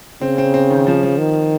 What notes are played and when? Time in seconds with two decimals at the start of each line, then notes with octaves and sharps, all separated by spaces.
0.21 C#3 C4
0.38 C4
0.54 C4
0.70 D#3
0.87 F3
1.03 F3
1.18 D#3